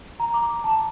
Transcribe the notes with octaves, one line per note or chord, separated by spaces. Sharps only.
A#5
D6
A5